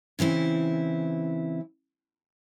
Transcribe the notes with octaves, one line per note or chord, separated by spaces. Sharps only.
C#3 E3 C4 E4